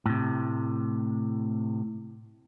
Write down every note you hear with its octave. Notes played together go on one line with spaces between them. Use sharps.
A2 C3